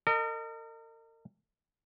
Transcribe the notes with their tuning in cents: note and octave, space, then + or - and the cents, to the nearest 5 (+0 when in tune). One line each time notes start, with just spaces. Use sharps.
A#4 -40 D#5 -20